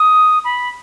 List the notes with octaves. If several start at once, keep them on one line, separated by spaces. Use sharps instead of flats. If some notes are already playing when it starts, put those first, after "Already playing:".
Already playing: D#6
B5